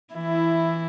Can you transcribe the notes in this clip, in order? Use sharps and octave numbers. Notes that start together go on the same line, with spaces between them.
E3 E4